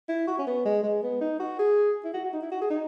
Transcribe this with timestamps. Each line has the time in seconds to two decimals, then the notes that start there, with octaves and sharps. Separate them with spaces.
0.09 E4
0.28 F#4
0.39 C#4
0.47 B3
0.65 G#3
0.83 G#3
1.03 B3
1.21 D#4
1.40 F#4
1.59 G#4
2.04 E4
2.14 F#4
2.24 F#4
2.33 D#4
2.42 E4
2.52 F#4
2.61 G#4
2.70 D#4